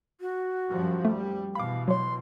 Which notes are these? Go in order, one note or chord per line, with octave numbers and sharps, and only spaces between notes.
F#4
F#2 F3 G3
G3 A3
B2 E3 F5 B5 D6
F#3 C#5 C6